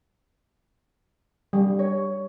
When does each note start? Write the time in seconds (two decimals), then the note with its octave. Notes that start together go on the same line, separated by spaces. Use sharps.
1.53 G3
1.79 C#5